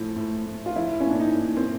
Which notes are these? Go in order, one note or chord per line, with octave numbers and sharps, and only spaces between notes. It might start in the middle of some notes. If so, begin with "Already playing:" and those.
Already playing: A2 F3 E4
A2
A2
F4
F3 E4
C#4
A#2 D4
D#4
A#2
C4